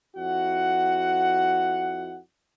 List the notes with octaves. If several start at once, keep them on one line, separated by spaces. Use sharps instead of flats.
F2 E4 F#4 F#5